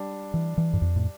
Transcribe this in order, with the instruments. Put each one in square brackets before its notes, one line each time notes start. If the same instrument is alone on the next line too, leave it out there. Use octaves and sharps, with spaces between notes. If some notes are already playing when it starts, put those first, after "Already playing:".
Already playing: [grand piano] G3 D4
[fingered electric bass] E3
E3
G2
F2
A2